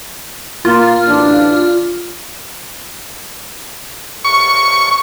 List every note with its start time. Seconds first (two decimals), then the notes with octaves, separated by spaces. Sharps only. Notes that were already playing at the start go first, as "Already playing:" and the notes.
0.65 A#2 A#3 F4
1.07 A1 D4
4.24 C#6